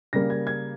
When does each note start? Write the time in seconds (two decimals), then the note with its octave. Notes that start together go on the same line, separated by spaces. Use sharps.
0.13 C#3 G3 A#3 A#6
0.30 G#6
0.47 G#6